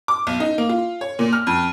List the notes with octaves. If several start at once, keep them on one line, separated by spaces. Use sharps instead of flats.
D6
B1
D#4
A#3
F4
C#5
A#2
F6
F2